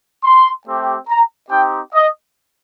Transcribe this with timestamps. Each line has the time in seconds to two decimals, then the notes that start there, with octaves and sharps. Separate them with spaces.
0.24 C6
0.66 A3 C4 G4
1.09 A#5
1.50 C4 D#4 G4 G5
1.93 D#5